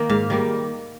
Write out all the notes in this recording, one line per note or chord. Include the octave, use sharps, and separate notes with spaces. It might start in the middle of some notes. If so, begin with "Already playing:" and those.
Already playing: D#3 A#3
G#2 F5
D#3 G3 A#3